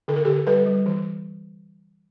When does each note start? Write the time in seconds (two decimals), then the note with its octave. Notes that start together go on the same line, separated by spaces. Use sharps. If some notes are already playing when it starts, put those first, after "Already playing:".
0.08 D3 A4
0.16 A#4
0.25 D3 G4 A4
0.47 G3 A4 B4
0.66 G3
0.86 E3